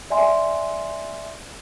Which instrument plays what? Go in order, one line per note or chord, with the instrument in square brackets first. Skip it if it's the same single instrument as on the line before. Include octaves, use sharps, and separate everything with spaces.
[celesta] D5 E5 G#5 C6